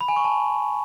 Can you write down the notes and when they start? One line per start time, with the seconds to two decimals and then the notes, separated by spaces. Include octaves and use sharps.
0.01 B5
0.08 G#5
0.16 C#6
0.24 A5